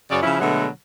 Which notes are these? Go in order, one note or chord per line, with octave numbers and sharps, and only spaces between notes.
F#2 C#3 F#3 C#5 D5
C#3 F3 C#4 E4
B2 D3 F#3 G#3 A3 B3